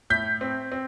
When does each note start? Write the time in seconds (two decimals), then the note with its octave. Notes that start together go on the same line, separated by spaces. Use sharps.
0.10 A2 G6 B6
0.41 C4
0.72 C4